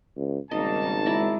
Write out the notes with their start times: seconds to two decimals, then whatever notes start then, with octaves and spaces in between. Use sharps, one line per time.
0.16 C#2
0.51 G#1 C#3 G3 A#3 D#4 D#5 A5
1.06 G#3 E4 D5 A#5